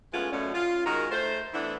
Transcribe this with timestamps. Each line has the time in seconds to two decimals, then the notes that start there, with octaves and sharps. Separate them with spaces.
0.13 G#3 A3 B3 C#4 F4
0.32 F#2 B2 D3 A3 C#4
0.54 F4
0.86 D#3 G#3 F#4 A#4
1.11 A3 C5
1.53 E3 A3 B3 D4 E4